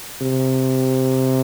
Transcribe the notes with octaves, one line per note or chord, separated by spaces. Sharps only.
C3